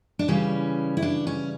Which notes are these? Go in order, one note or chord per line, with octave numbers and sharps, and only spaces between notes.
D4
C#3 E3 G3 C#4
E4
D4
C#4